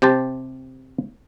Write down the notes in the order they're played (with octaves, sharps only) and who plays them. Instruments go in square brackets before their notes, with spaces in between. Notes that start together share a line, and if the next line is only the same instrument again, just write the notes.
[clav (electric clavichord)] C3 G4 C5 A5